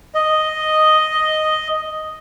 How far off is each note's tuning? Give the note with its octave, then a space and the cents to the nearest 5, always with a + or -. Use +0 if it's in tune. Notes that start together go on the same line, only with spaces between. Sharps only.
D#5 +0